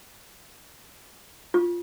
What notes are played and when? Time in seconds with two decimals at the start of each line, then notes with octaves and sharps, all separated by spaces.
1.54 F4